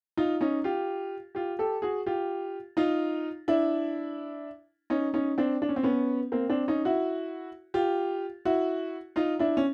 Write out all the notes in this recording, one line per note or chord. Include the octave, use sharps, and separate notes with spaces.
D#4 F4
C#4 D#4
F4 G4
F4 G4
G4 A4
F#4 G#4
F4 G4
D#4 F4
D4 E4
C#4 D#4
C#4 D#4
C4 D4
D4
C#4
C4
B3 C#4
A#3 C4
C4 D4
C#4 D#4
E4 F#4
F4 G4
E4 F#4
D#4 F4
D4 E4
C#4